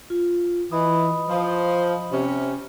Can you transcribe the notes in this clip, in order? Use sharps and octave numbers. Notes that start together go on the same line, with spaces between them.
F4
E3 D#5 B5 D#6
F3
C3 C#4